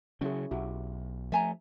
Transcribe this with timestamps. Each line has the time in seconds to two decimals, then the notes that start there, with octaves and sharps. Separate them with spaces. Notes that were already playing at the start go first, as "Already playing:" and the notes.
0.21 C#3 F#3 C#4 E4 G#4
0.51 B1 E4 F#4 G4
1.32 F3 A3 E5 G#5 A#5